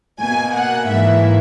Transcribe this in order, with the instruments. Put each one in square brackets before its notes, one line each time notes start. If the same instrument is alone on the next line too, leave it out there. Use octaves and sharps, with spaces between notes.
[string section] B2 A#3 G#5
F#5
G#2 E3 A#3 E5